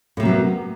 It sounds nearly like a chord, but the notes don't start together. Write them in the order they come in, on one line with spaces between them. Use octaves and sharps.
A2 C3 A#3 F#3 B3